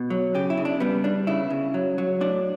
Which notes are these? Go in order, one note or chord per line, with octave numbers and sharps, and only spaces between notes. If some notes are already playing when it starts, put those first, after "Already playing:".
Already playing: B2
F#3
C#3 G4
E4
C#3
D4
G3 B3
G3 D4
C#3 E4
C#3
F#3
F#3
A2 D4